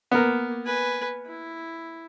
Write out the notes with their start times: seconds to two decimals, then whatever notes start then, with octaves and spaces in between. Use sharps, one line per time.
0.12 A#3 B3 A#4
0.66 B4 G#5
1.26 E4